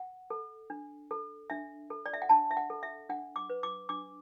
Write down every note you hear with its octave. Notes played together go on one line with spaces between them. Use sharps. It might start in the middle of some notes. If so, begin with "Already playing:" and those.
Already playing: F#5
A4
D4
A4
D4 E5
A4
D5
E5
F#5
D4 A5
E5
F#5
A4
E5
D4 F#5
D6
B4
D6
D4 D6